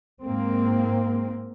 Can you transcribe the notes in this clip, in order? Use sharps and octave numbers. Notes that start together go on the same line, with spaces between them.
G#2 A#3 C4